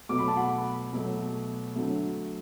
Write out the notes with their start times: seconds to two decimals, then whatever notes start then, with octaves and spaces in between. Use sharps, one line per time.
0.09 B2 F#3 A3 D6
0.18 B5
0.28 A5
0.37 F#5 B5
0.92 B2 F#3 A3
1.76 D3 F#3 A3